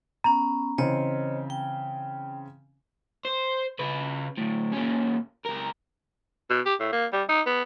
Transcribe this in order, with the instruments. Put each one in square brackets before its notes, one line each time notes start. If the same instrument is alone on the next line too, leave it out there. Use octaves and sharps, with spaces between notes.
[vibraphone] B3 C#4 [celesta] A#5
[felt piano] C#3 E3 C4 [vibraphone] C5 C#5 D#5
[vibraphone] G5
[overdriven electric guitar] C5
C#3 B4
D2 A2
A#2 C#4
C#2 A#4
[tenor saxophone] B2
G4
A2
A#3
G3
D#4
B3